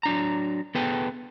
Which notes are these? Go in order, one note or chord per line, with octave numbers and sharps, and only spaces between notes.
F#3 D4 A#5
B3 G#4 A4 B4 G5